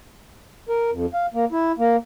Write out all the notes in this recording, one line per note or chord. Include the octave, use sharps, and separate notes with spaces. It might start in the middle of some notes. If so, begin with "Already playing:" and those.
A#4
F2
F5
A#3
E4
A#3